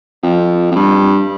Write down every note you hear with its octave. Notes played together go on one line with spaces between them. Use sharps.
F2
F2
G2